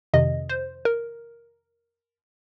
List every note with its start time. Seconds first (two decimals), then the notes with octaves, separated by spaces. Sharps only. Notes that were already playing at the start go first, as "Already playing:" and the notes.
0.14 F2 C3 D#3 D#5
0.49 C5
0.85 A#4